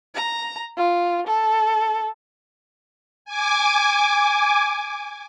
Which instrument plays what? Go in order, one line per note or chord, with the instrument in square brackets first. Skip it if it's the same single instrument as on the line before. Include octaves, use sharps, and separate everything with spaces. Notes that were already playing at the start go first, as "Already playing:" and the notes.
[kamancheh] A#5
F4
A4
[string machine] G#5 D6